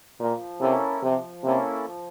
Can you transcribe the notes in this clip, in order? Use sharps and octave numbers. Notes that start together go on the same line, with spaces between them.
A#2 F3
C3 A#3 C#4 E4 A4
C3 F3
C3 A#3 C#4 E4 A4
F3